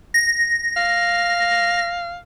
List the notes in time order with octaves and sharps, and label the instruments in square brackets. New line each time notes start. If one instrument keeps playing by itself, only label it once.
[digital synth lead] A#6
[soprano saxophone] F5